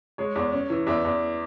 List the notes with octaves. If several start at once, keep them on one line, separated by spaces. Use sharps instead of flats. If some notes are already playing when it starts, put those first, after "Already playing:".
G#3 C#5
E2
C#4
E3
E2 E5
E2